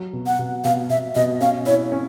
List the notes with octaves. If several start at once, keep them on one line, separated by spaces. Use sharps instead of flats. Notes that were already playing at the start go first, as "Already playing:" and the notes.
Already playing: F#3
B2
F#5
B2
B2 F5
B2 E5
B2 D#5
C#4 F5
E4 C#5
C#4